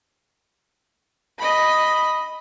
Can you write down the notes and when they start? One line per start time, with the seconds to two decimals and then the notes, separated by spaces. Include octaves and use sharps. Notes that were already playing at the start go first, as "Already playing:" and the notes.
1.39 D#5 B5